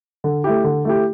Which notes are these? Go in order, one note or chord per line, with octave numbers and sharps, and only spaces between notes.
D3
A3 E4 G4
D3
A3 E4 G4